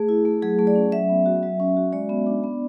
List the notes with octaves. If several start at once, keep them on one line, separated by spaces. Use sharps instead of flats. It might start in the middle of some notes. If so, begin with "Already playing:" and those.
Already playing: A3 G#4
E4
A3
F#3 G#4
A3
D5
C#4
F#3 E5
B3
F#4
F#3
C#4
F#4
G#3 D5
B3
D4
B3